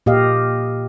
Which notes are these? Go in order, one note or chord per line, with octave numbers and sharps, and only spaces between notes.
A#2 G4 D#5 F5